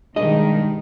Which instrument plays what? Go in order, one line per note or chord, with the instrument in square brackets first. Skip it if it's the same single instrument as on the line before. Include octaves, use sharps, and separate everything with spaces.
[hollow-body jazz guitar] B1 D#5 [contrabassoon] G2 [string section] D#3 [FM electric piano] G#3